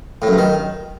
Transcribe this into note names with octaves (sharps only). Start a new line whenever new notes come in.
A2
F#2
G2
D#3